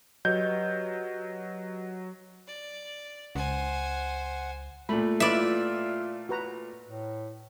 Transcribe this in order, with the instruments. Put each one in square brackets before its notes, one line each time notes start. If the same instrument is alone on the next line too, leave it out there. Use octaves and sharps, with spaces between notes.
[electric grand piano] F#3 G6 [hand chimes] G4 B4 D#5
[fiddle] D5
[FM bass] C#2 [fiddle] C5 G#5 [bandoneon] F#5
[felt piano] A#2 A3 [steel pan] B5
[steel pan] E4 B4 B5 [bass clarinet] F4 [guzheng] D5 E5
[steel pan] F#4 B4 A#5
[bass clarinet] A2